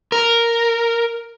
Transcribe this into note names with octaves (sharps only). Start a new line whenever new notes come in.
A#4